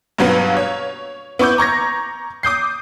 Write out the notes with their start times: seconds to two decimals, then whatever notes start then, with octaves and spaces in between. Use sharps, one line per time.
0.18 G2 B2 F#3 A#3 B3 F4
0.57 C#5
1.39 B3 E4 C#6 D6 G6
1.58 A#5 C#6 G#6 A#6
2.43 D6 D#6 G6 C7